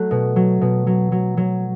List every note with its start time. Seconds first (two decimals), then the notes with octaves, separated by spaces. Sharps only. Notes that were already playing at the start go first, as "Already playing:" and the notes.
Already playing: F#3 A3 F#6
0.11 B2
0.36 F#3
0.61 B2
0.87 F#3
1.12 F#3
1.37 F#3